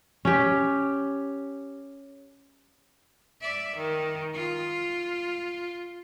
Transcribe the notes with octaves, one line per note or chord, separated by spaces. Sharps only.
C#4 G4
D5 E5
D#3
F4